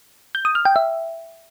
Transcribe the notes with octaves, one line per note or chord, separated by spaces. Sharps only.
G6
D#6
F6
G5
E5